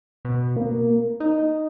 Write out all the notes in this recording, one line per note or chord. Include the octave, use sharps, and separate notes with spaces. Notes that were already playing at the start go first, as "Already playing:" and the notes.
B2
A#3
D#4